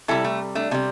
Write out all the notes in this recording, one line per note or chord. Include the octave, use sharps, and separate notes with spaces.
C3 G3 E4 A4
A3
A3 D4
C3 G3 A3